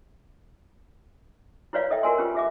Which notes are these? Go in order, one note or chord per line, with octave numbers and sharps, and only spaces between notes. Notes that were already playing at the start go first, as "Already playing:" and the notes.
E4 F#4 B4 C#5 D5 F5
A4 D#5 E5 G5
F#4 A#4 G#5 C6
C#4 F4 G4 B4
G#4 E5 D6